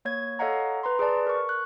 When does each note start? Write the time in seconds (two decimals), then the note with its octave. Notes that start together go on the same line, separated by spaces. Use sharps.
0.05 A#3 C#5 G#6
0.39 A4 C#5 D#5 F5 F#5 A#5
0.83 B4 A#5 C6
0.99 G#4 B4 D5 A5
1.27 A#4 C#6
1.49 F#6